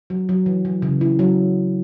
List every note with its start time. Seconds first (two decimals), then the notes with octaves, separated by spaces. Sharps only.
0.10 F#3
0.29 F#3
0.46 E3
0.65 E3
0.82 C#3
1.01 E4
1.19 F#3